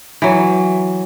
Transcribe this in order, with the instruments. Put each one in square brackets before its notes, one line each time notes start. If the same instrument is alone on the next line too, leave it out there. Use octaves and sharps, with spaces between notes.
[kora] E3 F#3